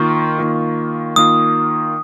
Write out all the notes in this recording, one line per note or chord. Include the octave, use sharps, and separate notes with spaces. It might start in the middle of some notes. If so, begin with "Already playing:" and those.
Already playing: D#3 A#3 F4 C#6
D#3 A#3 F4
D#3 A#3 F4 D#6